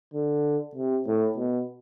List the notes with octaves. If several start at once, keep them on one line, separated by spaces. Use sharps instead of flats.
D3
C3
A2
B2